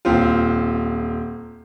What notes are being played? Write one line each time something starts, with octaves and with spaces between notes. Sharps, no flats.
D#1 C4 F4